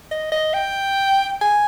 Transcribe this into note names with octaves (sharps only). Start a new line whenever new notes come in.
D#5
D#5
G5
G#5